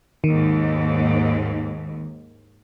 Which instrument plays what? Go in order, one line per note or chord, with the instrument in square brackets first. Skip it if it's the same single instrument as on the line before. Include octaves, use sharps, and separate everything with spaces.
[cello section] D#2 G#2 [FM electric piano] D#3